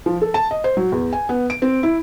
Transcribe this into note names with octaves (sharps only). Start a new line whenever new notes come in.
F3
A4
A5
D#5
C5
F#3
E2
G#5
B3
D7
C4
E4